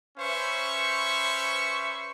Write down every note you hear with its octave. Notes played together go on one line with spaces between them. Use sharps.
C#4 B4 C5 E5 C#6